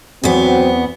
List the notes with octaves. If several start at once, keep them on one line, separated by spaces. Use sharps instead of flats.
E2 F#3 B3 C4